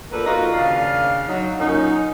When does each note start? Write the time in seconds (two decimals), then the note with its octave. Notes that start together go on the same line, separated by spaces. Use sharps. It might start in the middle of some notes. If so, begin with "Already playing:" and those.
0.12 F3 A#3 B3 D4 A4 B4
0.26 F3 A#3 D#4 F4 F#4 B4
0.53 D#2 C#3 D4 F5
1.28 F#3 D#4
1.59 F#2 A#2 C#4 D#4